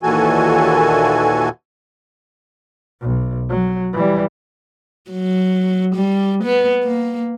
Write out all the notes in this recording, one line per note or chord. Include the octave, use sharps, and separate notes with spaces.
D#2 A#2 E3 F#4 A4 G#5
B1
F#3
E3 G3
F#3
G3
B3
A#3